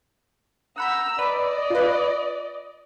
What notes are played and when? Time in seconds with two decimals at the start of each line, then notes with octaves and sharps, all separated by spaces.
0.78 F#5 A#5 B5 E6 G6
1.19 B4 D5 D#5
1.70 F4 B4